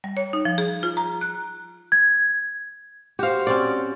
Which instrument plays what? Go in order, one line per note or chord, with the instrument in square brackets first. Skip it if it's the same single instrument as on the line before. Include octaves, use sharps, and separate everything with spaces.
[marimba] G3
C#5
D#4
F3
G#4
F4
A#5
F#6
[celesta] G#6
[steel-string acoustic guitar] F#4 C5 [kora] G4 F5
[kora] C4 C#4 D5